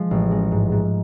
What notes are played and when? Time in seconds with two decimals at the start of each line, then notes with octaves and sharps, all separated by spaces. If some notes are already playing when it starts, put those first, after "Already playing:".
Already playing: F3 G#3
0.11 A1
0.31 G#3
0.52 G#2
0.72 G#2